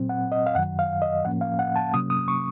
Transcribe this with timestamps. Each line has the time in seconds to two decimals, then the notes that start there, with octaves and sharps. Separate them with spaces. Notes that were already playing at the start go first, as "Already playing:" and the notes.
Already playing: A#2 F#3 C4
0.09 F#5
0.32 D#5
0.46 F5
0.55 F#2 D#3 F#3 F#5
0.79 F5
1.02 D#5
1.24 A2 F3 A#3 C#4 F#5
1.41 F5
1.59 F#5
1.76 A5
1.93 C3 F#3 A#3 C#4 D#6
2.10 D#6
2.28 C#6